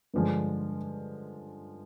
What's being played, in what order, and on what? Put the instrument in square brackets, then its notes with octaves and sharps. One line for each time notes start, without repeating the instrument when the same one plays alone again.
[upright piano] G2 D3 F3 G#3